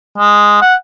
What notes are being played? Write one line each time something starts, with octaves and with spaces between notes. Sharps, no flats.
G#3
F#5